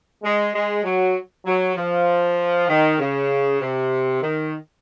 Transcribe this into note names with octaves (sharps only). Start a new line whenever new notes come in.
G#3
G#3
F#3
F#3
F3
D#3
C#3
C3
D#3